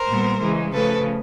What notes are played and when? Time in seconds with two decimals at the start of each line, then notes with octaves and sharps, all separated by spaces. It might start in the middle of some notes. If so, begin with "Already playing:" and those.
Already playing: A#4 C5
0.08 A#2 G3 B3
0.40 C#3 E3 G#3
0.72 C#3 F3 A3 A4 B4